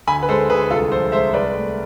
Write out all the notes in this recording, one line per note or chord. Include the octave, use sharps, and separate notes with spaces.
D2 G#5 B5
B4
G#3 A4 C5
D2 G#4 B4
C2 F4 A4
F3 A4 C5
G#3 C5 E5
C2 B4 D5
A3